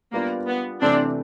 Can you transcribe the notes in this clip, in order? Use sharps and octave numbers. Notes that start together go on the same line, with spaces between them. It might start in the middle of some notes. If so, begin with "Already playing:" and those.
G3 A#3 B3 D4 F4
B3
C3 E3 A3 C4 D4